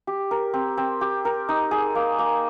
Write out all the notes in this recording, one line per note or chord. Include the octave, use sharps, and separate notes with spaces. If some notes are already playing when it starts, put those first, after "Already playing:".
G4
A#4
C4
C4
G4
A#4
D#4
G#4
A#3
A#3